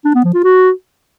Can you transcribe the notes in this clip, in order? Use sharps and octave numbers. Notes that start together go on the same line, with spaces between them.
D4
B3
F3
F4
F#4